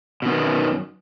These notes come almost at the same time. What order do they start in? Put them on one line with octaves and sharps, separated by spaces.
B2 D#3 B3 F#2